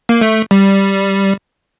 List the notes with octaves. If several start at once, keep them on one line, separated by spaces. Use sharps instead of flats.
A#3
A3
G3